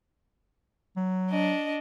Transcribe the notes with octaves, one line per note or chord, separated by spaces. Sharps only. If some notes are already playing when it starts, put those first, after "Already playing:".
F#3
D4 D#5